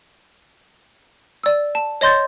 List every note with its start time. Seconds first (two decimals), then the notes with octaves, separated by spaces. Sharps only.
1.43 D5 E6
1.75 A5
2.01 C#5 D#5 C6 G6 A6